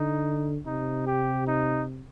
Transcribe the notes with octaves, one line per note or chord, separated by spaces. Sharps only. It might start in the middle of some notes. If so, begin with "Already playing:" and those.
Already playing: D3 D#4
C3 D#4
G4
D#4